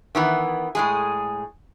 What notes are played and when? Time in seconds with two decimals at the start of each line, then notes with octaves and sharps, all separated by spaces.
0.15 D#3 E3 B3
0.75 A2 G#3 G#4